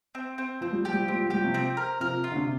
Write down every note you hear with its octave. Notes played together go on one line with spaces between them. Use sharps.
C4
C4
F3 C4
G3
F3 G4
G3
F3
G3 C4
F3
G3 G4
C3 F3
C4
A#4
C3 F3 A#4
F4
D3
C3